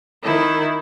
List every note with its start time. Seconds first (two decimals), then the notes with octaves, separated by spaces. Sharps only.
0.24 D#3 E4